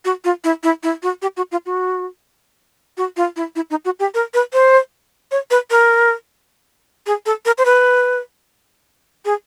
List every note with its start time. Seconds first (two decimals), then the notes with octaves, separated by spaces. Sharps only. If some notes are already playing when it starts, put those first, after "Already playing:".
0.05 F#4
0.24 F4
0.44 E4
0.63 E4
0.83 E4
1.03 F#4
1.22 G4
1.37 F#4
1.52 F4
1.66 F#4
2.97 F#4
3.17 F4
3.36 E4
3.56 E4
3.70 D#4
3.85 F#4
3.99 G4
4.14 A#4
4.34 B4
4.53 C5
5.31 C#5
5.51 B4
5.70 A#4
7.07 G#4
7.26 A4
7.46 A#4
7.58 C5
7.65 B4
9.25 G#4